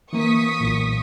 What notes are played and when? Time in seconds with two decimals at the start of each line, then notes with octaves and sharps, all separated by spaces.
0.13 E3 A#3 C#6 D#6 B6
0.60 B1 A#2